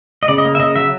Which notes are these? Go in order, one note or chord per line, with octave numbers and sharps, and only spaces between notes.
D#5
C#3 D5
D#5
A#3
E5
C#3 D#5
F#3 E5